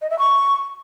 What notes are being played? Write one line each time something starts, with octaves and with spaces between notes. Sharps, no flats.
D#5
E5
C#6